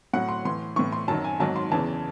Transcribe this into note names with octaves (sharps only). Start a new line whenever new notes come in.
A2 F#3 F#5
C6
A2 E3 C6
A2 E3 C#6
C6
F#2 D#3 F#3 A5
G#5
G#2 D#3 F#3 A5
C6
E2 C#3 E3 A5